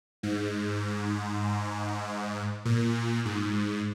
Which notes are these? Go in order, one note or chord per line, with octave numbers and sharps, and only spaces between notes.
G#2
A#2
G#2